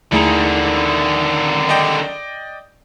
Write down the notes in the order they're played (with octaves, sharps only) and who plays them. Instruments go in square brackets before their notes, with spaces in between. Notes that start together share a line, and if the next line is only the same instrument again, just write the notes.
[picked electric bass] D#2 A3 [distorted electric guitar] D3 D#3 [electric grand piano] E4 G#4 A#5
[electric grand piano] D5 D#5 G5